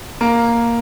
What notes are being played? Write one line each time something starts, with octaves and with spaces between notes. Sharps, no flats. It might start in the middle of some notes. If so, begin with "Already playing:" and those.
A#3